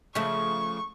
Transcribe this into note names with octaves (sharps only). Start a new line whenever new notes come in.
C#3 F3 A3 C#6